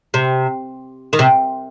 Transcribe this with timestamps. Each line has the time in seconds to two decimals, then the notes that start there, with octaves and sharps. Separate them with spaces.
0.14 C3
1.13 D#3
1.19 C3